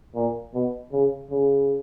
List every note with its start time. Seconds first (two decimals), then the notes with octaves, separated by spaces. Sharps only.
0.15 A#2
0.54 B2
0.92 C#3
1.30 C#3